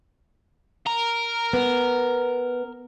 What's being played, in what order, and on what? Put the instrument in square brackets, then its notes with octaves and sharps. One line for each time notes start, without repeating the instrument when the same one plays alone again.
[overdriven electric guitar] A#4
[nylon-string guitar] B3